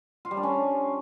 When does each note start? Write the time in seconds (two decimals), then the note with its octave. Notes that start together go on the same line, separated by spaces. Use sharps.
0.25 F4
0.31 G3
0.37 D4
0.43 C#4